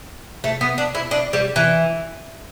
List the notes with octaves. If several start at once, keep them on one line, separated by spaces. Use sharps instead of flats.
A3
B3
D4
E4
D4
G3
E3